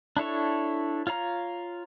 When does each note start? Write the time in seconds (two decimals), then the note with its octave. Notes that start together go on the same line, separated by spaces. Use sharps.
0.17 D4 E4 A4 C#5
1.07 F4 C#5 F5 A#5